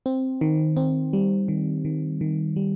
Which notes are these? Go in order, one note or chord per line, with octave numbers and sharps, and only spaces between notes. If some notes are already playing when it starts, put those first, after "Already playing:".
C4
D#3
C4
G3
D#3
D#3
D#3
G3